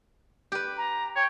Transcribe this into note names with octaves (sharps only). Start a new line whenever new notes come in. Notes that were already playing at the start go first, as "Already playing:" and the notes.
G4 B4
A#5
C#5 G5